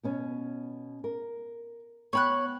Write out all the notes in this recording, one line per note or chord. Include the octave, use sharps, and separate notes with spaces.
B2 B3 C#4
A#4
B3 C#5 G5 B5 F#6